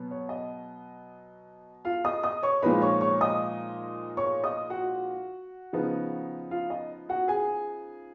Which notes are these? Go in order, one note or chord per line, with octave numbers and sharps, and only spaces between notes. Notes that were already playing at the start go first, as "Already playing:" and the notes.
Already playing: B2 F#3 B3
C#5
D#5
F4 F5
D#5 D#6
D#5 D#6
C#5 C#6
A#2 F3 G#3 D#4 B4 B5
C#5 C#6
C#5 C#6
D#5 D#6
C#5 C#6
D#5 D#6
F#4 F#5
C#3 F3 B3 D#4
F4 F5
D#5
F#4 F#5
G#4 G#5